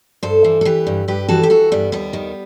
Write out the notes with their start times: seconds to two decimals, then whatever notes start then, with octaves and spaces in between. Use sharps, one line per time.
0.23 G2 A4 C5
0.44 E3
0.61 A4
0.65 E3 G4 B4
0.87 G2
1.08 G2 G4 B4
1.28 E3 F#4 A4
1.43 G4
1.50 E3 F#4 A4
1.72 G2 G3 B3
1.92 D#2 G3 B3
2.13 D#3